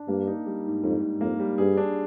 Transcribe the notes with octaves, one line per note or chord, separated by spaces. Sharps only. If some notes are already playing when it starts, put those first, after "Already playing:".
Already playing: D4
G2 A#3
D#4
G3
G#2
F2 G#2
G#2
F2 A#3
G3
G2 G#4
D4